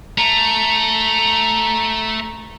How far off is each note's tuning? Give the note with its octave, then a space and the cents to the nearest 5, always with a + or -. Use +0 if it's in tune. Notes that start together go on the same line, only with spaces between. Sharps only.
A3 +0 A#5 +5